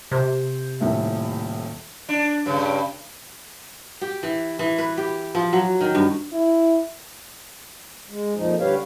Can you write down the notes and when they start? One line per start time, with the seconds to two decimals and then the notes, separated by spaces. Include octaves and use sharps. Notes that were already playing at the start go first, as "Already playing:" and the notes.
0.11 C3 C5
0.80 D#1 A2 E5
2.09 D4
2.46 G2 C#3
4.01 G4
4.23 E3
4.59 E3
4.78 B4
4.97 G4
5.35 F3
5.53 F#3
5.81 D#3
5.95 G2
6.33 E4
8.09 G#3
8.35 F2 A#2 F3 D#4
8.59 D3 G3 G4 B4 C#5 F5